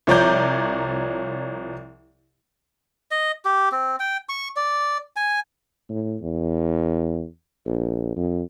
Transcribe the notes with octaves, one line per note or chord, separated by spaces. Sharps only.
C2 F3 C#5 D5 A#5 G6
D#5
G4
C4
G5
C#6
D5
G#5
A2
E2
A#1
F2